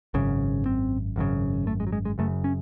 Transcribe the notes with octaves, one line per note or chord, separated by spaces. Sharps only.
G#1 F#2 C#3
C4
G#1 F#2 C#3
A3
G#3
F#3
G#3
G#3
F#1 F#2 C#3 A3
C#4